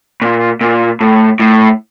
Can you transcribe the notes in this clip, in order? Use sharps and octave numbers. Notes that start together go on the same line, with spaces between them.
A#2
A#2
A2
A2